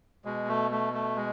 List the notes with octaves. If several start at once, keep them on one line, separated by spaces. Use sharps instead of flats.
B2 G#3
A3
A3
A3
G#3